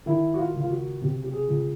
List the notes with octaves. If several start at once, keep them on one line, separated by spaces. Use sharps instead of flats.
D#3 E4
F#4
F4
C#2
F4
F#4
C3 G4
G4
G#4
C#2